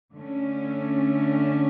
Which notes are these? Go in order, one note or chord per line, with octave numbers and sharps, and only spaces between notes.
D3 A3 C#4